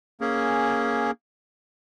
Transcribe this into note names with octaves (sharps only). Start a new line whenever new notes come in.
A#3 C#4 G#4